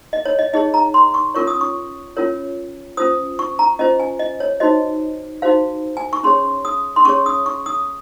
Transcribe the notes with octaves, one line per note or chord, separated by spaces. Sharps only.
D#5
C#5
D#5
D#4 G#4 C#5 D#5
A#5
C6
C#6
C#4 F4 A#4 C#5 C#6
D#6
C#6
C#4 F4 A#4 C#5
C#4 F4 C5 D#6
C#6
A#5
C#4 F4 C5 D#5
G#5
D#5
C#5
D#4 F#4 C5 D#5
D#4 F#4 C5 F5
G#5
C#6
C#4 G#4 C#5 C6
D#6
C6
C#4 G#4 C#5 C#6
D#6
C#6
D#6